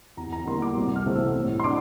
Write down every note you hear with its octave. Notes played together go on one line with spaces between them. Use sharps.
E2 A#5
A#5
E3 G3 A#3 C6
D6
C2
F6
C3 E3 A3 C4
E6
A2
C6
D4 D6